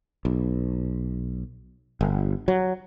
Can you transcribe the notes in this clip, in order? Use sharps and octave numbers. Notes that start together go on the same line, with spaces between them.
B1
G1
F#3